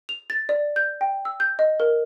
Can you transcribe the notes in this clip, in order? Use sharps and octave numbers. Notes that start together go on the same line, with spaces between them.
F7
A6
D5
G6
G5
E6
G6
D#5
A#4